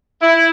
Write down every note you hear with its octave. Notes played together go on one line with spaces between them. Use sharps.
E4